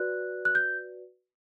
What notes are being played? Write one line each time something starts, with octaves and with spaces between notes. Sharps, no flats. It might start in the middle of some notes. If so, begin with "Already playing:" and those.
Already playing: F#4 B4 D5 F#6
F#6
G6